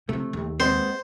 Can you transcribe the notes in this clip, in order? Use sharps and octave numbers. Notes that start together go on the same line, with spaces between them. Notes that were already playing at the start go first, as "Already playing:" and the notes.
C3 E3 A3
D#2
G#3 B3 C4 C5